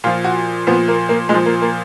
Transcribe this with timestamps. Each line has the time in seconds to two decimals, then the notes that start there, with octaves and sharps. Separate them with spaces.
0.04 A#2 F4
0.07 F3
0.25 F#4
0.67 A#2 F3 B3
0.88 A#3
1.09 A#3
1.29 A#2 G#3
1.35 F3
1.46 A#3
1.62 A#3